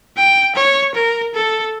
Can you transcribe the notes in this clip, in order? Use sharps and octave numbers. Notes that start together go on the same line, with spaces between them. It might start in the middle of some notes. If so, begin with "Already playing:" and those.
G5
C#5
A#4
A4